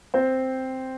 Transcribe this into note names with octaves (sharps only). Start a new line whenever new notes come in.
C4 C5